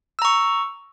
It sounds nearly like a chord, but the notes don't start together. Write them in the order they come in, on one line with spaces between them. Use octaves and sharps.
E6 A#5 C#6